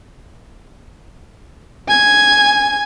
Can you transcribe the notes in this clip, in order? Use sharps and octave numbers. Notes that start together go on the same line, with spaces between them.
G#5 G#6